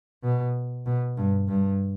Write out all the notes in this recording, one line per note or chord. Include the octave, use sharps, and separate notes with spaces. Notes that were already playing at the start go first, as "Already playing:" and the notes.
B2
B2
G2
G2